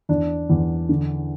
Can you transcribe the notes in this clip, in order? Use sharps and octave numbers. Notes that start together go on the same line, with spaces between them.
E2 D4
E2
D3